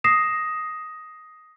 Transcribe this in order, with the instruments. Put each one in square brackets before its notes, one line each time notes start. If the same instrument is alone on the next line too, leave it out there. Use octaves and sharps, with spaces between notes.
[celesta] D#6 A#6 C7 E7